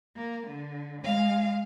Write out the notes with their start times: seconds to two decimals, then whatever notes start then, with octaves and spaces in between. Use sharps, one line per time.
0.16 A#3
0.47 D3
1.02 G#3 F5